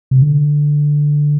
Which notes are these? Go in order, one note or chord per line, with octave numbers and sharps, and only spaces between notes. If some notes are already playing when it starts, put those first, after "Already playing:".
C3
D3